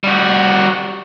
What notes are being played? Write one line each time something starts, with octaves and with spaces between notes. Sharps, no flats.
G3 F#4